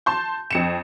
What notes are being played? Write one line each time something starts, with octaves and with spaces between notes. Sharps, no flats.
A5 C6 G6
F2 C#7 E7